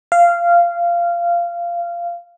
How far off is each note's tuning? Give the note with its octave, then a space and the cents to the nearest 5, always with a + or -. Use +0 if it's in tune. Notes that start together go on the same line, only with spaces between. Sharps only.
F5 -15